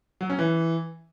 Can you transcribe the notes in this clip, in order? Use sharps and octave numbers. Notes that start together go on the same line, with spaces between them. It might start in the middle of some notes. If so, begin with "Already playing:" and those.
F#3
C#4
E3